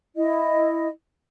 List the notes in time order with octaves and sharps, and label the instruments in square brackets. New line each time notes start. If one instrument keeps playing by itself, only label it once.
[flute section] E4 D#5